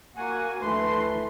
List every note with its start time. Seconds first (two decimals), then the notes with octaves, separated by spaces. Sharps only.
0.16 A#3 F#4 F#5 G#5
0.61 D2 E3 A3 B4 C6